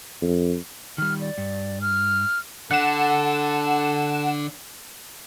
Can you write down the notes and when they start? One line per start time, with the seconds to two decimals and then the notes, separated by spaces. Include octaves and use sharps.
0.21 F2
0.98 D#3 G3 F6
1.21 D5
1.38 G2
1.81 F6
2.71 D3 A4 F#5 E7